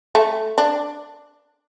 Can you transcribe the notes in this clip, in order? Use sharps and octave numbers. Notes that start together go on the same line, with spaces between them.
A3
D4